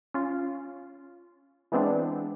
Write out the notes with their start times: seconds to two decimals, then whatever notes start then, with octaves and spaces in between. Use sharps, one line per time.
0.14 C#4 F4
1.72 E3 G#3 B3 C4 D4